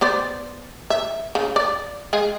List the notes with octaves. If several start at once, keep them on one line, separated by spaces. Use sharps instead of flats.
B3 C5 D5
E5
C#3
D5
G#3 G#4 F5